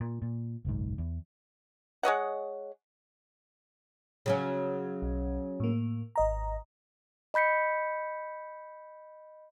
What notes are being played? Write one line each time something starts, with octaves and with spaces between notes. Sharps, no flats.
A#2
A#2
F#1 B1 G#2
E2
G#3 C#5 D#5 F#5
C#3 F#3 C#4
B1
A2 A#3
G#1 D#5 A#5
D#5 B5 G6 B6 C#7